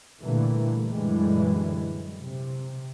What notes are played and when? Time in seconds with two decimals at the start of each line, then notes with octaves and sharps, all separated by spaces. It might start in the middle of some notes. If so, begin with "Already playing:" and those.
0.23 A#2 D3 E3 G3 A3 A#3
0.91 F#2 A#2 D3 E3 G3 G#3
2.23 C3